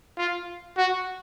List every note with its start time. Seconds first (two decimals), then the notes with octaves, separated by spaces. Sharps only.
0.18 F4
0.78 F#4